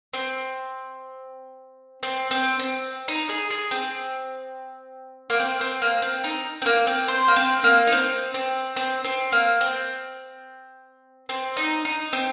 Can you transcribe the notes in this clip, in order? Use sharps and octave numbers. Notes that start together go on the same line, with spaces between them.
C4
C4
C4
C4
D#4
G#4
G#4
C4
A#3
C4
C4
A#3
C4
D#4
C4
A#3
C4
C5
A#3
C4
A#3
D#4
C4
C4
C4
C4
A#3
C4
C4
D#4
D#4
C4